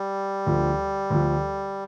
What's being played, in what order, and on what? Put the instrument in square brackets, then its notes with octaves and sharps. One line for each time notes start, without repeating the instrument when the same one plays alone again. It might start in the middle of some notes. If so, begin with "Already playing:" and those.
Already playing: [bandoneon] G3
[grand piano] D2 D3 F3
D2 D3 F3